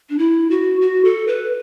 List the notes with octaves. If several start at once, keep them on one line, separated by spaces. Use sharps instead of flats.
D4
E4
F#4
F#4
A4
B4